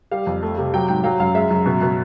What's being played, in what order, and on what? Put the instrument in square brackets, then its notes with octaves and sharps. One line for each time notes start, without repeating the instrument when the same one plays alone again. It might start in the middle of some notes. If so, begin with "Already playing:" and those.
[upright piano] G3 F5
F2
A3
C3
F#3 G5
G#2 G5
F#3 F5
F#2 F5
G#3 E5
F#2
B2
B2